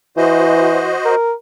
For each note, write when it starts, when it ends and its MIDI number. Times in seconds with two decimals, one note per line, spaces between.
0.17 0.92 52
0.17 1.15 66
0.17 1.15 72
0.17 1.15 75
1.05 1.33 70